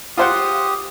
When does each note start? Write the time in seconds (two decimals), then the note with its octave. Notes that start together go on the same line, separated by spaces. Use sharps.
0.18 F4 G4 C5 F#5 D#6